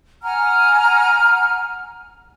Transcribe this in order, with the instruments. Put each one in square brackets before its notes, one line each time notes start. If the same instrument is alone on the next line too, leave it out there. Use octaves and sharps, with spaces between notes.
[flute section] F#5 G#5 A#5 F6